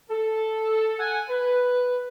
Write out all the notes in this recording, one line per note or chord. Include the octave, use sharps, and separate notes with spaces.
A4
F#5 G#5
B4